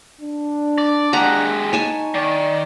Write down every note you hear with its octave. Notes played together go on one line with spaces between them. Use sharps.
D4
D5
G#3 G4 F#5 A#5
D#4 C#5 G#5 A5
D#3 D5